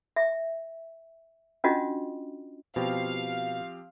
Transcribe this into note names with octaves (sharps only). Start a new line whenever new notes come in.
E5
C#4 D4 F4 F#4 D#5
B2 F3 C4 G4 F5